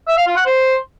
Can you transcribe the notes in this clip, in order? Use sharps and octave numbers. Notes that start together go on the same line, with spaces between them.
E5
F5
F4
F#5
C5